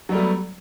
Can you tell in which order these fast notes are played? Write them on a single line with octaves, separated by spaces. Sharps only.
F#3 G3 A3 B3